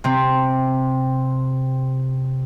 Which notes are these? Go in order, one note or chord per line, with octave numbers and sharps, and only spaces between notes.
C3 C4